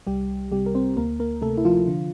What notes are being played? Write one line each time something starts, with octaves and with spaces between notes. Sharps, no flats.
C2 G3 G4
C3 G3 G4
A#4
C4 C5
D2 A#3 A#4
A#3 A#4
C3 A3 A4
E4
F3 F4
D3